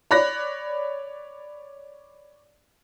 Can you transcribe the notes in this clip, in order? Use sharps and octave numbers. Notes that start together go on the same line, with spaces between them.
C#5 D5 B5 F#6 A#6